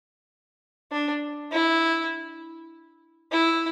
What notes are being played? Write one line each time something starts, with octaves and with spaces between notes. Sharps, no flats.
D4
E4
E4